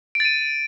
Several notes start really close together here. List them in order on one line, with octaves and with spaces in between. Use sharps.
D7 A6 D#7